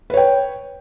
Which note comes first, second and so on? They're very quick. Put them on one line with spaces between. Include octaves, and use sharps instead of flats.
B4 C#5 G5